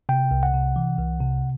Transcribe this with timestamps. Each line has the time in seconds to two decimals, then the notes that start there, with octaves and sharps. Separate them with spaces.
0.09 C3 G5
0.31 C2
0.43 F#5
0.54 C3
0.76 E3
0.98 C2
1.20 C3